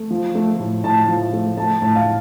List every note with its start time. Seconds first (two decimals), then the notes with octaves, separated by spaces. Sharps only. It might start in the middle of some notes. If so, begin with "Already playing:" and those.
Already playing: A3
0.10 F3
0.35 A3
0.59 A2
0.84 A2 A5
1.08 F3
1.33 A3
1.57 A3 A5
1.82 A2 A5
1.95 F5